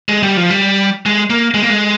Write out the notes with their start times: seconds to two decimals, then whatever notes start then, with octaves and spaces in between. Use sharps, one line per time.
0.09 G#3
0.23 G3
0.37 F3
0.50 G3
1.06 G#3
1.30 A#3
1.54 G#3
1.62 A#3
1.70 G#3